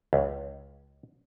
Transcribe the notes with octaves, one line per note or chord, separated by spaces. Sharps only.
C#2